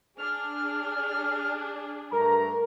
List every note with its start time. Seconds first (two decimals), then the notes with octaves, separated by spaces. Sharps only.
0.18 D4 G#4 F6
2.13 G2 A3 A#4 A#5